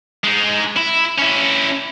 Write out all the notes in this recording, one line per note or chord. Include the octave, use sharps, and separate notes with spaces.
G#3 D#4
E4
C#4 E4